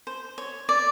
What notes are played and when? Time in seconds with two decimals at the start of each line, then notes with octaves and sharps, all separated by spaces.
0.07 C5
0.38 C#5
0.69 D5